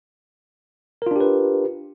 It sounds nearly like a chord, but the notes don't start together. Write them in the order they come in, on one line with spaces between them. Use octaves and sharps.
A#4 F4 D4 G4 B4